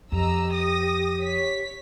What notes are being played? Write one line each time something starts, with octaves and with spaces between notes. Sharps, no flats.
F2 G4 D#5 A#5 E6
D#6 A#6
C#5 B6